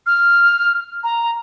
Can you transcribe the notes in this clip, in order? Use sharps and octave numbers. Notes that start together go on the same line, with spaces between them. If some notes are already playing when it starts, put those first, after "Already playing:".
F6
A#5